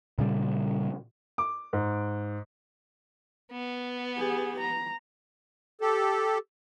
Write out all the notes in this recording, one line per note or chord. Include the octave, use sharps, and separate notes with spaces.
A#2 C#3 G3
D6
G#2
B3
G4 G#4
A#5
G4 A4